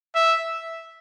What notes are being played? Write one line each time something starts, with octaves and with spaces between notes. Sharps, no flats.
E5